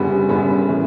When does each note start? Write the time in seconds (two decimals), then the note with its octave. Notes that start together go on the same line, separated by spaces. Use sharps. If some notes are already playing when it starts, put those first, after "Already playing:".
Already playing: F#1 F#2 D3 G3 B3
0.29 F#1 F#2 D3 G3 B3
0.68 A2 E3